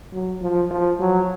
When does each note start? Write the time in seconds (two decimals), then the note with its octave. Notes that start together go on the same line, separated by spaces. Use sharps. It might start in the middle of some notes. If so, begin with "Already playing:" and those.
0.13 F#3
0.42 F3
0.71 F3
1.00 F#3